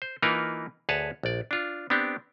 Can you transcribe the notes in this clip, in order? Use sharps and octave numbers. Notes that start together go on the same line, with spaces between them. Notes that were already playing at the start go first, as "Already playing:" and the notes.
C5
E3 A#3 D#4 F4 A#4 B4
D2 G#4 B4 C#5 A5
A#1 D5
D4 F4
B3 C4 D4 G4